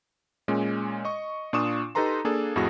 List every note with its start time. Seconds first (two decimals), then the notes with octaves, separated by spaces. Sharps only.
0.48 A#2 G#3 C#4
1.05 D#5 C#6
1.53 A#2 D4 F4 C#6 D#6 E7
1.95 D#4 G4 A4 B4 A#5 C6
2.25 A#3 D4 G#4 A4
2.56 F2 A2 F#4 G#4 D#6 A#6